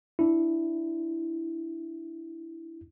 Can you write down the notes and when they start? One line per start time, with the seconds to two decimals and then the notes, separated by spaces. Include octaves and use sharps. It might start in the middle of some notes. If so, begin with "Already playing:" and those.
0.19 D4 E4